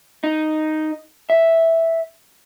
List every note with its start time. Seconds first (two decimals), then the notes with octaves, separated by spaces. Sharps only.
0.24 D#4
1.30 E5